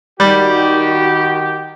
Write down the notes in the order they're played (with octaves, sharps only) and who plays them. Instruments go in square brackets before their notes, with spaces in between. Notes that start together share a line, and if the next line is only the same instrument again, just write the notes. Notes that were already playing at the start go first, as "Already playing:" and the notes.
[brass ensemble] D#3 F#4 G4 [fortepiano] G3